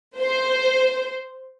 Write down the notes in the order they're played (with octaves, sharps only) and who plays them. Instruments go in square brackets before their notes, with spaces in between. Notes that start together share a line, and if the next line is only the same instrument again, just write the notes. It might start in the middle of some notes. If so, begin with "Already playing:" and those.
[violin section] C5